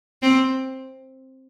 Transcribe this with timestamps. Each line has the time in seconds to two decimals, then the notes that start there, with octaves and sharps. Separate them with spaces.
0.22 C4